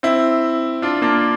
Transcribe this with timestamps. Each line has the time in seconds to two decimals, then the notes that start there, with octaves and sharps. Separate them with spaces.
0.03 C4 E4
0.82 D4 F4
1.02 A#3 D4